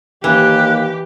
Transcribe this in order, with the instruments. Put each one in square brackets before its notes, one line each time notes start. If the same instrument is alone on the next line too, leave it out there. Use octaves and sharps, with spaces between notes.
[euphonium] D#2 [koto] E3 [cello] G4 [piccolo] F#6